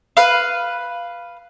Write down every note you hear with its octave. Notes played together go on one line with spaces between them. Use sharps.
B4 F5